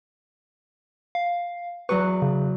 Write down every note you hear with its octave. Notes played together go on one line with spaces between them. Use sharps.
F5
E2 F#3 B4 C#6
C#3